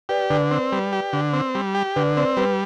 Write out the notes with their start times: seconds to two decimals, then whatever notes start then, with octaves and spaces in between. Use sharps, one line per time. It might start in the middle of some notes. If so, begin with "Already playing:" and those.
0.09 G4 B4 D5
0.30 D3 B4 D5
0.51 C4
0.72 G3
0.93 G4
1.13 D3
1.33 C4
1.55 G3
1.75 G4
1.96 D3 B4 D5
2.16 C4 B4 D5
2.37 G3 B4